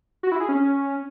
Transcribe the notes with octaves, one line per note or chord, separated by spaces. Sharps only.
F#4
E4
G#4
C#4